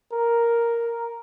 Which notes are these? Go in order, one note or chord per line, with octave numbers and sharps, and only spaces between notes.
A#4